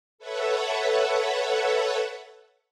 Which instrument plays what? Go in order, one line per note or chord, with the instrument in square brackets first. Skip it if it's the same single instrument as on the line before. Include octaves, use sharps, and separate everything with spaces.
[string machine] A4 B4 C#5 E5 F#5